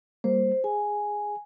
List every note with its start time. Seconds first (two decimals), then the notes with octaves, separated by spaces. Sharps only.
0.24 G3 A#3 C5
0.64 G#4 G#5